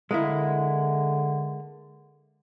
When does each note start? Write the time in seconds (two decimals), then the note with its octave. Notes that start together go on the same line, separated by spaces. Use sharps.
0.11 D3 G#3 A#3 E4